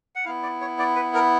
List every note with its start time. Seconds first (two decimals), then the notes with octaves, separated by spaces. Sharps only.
0.16 F#5
0.25 B3 E4 F5
0.43 D5
0.61 C#5
0.79 D5
0.96 B4
1.14 A#4